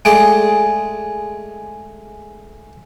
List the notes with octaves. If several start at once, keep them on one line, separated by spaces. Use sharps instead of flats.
G#3 A3 G#4 D5 G5